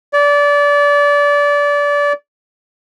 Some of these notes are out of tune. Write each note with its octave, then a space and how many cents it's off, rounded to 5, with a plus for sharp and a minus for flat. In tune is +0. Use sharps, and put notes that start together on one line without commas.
D5 -25